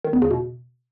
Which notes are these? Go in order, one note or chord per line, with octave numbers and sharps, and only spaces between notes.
D#3
E2
C#3
B2